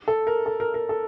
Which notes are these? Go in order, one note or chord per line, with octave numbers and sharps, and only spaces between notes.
A4
A#4
A4
A#4
A#4
A4